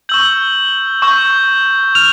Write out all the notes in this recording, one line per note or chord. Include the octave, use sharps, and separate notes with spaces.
C#6 E6 G6 F#7
C#6 E6 G6
F6 F7